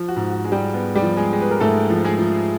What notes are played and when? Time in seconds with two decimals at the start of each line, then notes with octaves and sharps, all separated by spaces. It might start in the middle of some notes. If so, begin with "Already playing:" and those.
Already playing: F3
0.08 F#4
0.16 G#2
0.30 F#4
0.44 G#3
0.52 G3 G4
0.74 B3
0.96 G3 G4
1.02 F3
1.17 G#3 G#4
1.33 G#3
1.42 B4
1.51 A#4
1.60 G#2 A3 A4
1.90 F3
2.04 G#3 G#4
2.19 F3